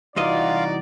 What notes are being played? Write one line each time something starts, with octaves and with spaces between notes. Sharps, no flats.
C2 E3 D#4 F4 F#4 D5 D#5 F5